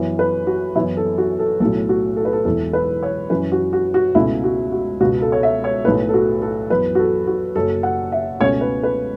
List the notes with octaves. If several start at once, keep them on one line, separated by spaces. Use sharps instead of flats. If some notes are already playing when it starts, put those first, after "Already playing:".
Already playing: F#2 E3 B3
B4
F#4
F#2 E3 B3 E4
A4
F#4
A4
B1 A2 F#3 A4
F#4
A4
B4
A4
E1 E2 E3 A4
B4
C#5
F#2 E3 C#4 B4
F#4
F#4
F#4
C#2 B2 A3 C#4 E4
F#4
F#4
C#2 B2 B3 F#4
A4
C#5
E5
C#5
B1 A2 A3 B4
A4
F#4
A4
F#2 E3 B3 B4
F#4
A4
F#4
F#1 F#2 F#3 A4
F#5
E5
C#2 B2 A3 C#4 C#5
B4
B4